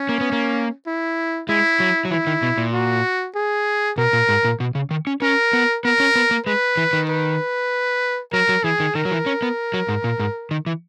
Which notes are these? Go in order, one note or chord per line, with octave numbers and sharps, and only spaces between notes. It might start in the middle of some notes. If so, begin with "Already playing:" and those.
Already playing: C#4
A#3
B3
A#3
E4
G#3 E4
F#3
F#3
E3 E4
D#3
B2
A#2
F#4
G#4
B2 A#4
A#2
G#2
A#2
B2
C#3
D#3
C#4
C#4 A#4
B3
B3 A#4
C#4
B3
A#3
G#3 B4
E3
D#3
B4
F#3 A#4
F#3
E3 G#4
D#3
D#3 A#4
F#3
E3
C#4
B3
F#3
G#2
A#2
G#2
D#3
E3